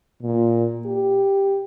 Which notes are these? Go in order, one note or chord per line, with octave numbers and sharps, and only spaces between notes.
A#2
G4